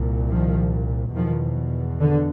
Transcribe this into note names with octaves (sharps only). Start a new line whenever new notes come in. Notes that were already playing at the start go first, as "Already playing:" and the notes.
Already playing: C2 A#2
D#3 F3
E2 B2 D#3 F3
D3